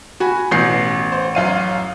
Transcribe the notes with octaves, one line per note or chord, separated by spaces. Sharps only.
F#4 G#5 B5
A1 B2 G6 C7
C5
F#2 F5 D#7